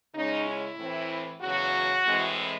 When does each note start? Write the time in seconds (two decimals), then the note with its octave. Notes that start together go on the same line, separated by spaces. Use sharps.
0.14 C#3 G#3 C#4 D#4
0.46 E4
0.78 A2 E3 C4
1.41 E2 C#3 F#3 F#4
2.05 A2 E3 G#3 C4